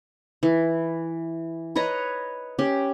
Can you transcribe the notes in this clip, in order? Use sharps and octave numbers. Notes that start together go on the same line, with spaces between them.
E3
B4 C#5 D#5 A#5
C#4 G4